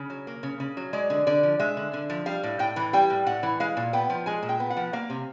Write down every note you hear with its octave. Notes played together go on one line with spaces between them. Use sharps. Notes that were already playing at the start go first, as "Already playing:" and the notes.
Already playing: C#3
F#3
A#3
C#3
C#3
F#3
G#3 D5
D3
D3 D5
F3
G#3 E5
D3
D3
F3
G3 F5
A2
A2 G5
E3
G3 G5
A2
A2 F#5
E3
G#3 F5
A#2
B3 G5
F3
G#3 G#5
A#2
G5
B3
F#5
F3
A#3 F5
C3